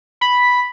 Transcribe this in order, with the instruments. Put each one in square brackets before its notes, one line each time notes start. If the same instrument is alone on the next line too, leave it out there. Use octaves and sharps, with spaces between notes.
[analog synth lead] B5